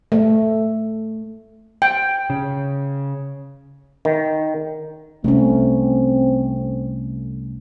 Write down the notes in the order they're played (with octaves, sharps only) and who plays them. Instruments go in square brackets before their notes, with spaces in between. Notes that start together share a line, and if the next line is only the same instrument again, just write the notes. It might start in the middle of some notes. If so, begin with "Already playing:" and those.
[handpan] A3
[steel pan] G5
[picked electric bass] C#3
[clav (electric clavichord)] D#3
[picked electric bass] C2 [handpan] A3 C#4 [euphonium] C4